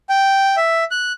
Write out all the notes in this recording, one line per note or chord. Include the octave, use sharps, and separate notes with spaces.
G5
E5
F#6